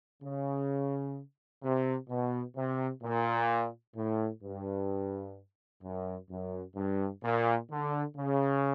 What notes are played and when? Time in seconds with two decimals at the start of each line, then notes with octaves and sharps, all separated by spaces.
0.22 C#3
1.63 C3
2.09 B2
2.55 C3
3.03 A#2
3.96 A2
4.42 G2
5.83 F#2
6.30 F#2
6.76 G2
7.23 A#2
7.70 D3
8.17 C#3